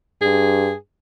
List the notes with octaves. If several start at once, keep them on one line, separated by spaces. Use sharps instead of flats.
G2 G#4